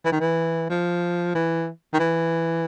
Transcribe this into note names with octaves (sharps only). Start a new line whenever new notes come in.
E3
D#3
E3
F3
E3
D#3
E3